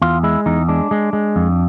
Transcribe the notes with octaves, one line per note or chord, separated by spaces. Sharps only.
E2 F4
G#3 E4
E2 D#4
G#3 D4
G#3
G#3
F2